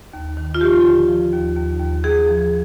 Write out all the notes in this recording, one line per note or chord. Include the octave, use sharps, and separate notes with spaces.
D#2
D#3
F4
F3 G4
D3
F3
D#2
D#2
D#2
D#2 G#4
F3